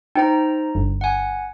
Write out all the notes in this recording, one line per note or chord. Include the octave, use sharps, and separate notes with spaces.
D#4 C5 G5 A#5
G1
F#5 G#5